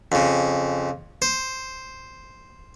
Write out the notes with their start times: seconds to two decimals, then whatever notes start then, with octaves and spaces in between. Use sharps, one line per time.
0.12 F2 C#3
1.22 C5